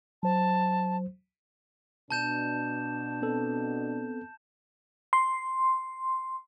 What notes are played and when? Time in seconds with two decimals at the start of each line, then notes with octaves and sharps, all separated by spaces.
0.23 F#3 C5 A5
2.11 B2 D4 A5 G6 E7
3.22 B3 C4 A4
5.13 C6